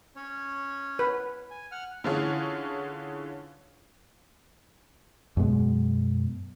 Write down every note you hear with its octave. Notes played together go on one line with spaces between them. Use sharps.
C#4 C#5
B4
G#5
F#5 F6
D3 E3 C#4 F4 G#4 C#5
F#2 B2 G#3 B3